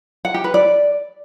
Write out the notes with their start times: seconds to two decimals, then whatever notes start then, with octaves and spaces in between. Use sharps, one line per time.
0.25 F#5
0.34 G4
0.44 B4
0.54 D5